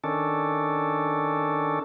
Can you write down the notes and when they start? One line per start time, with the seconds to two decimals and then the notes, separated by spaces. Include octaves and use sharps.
0.04 D#3 C#4 D4 A4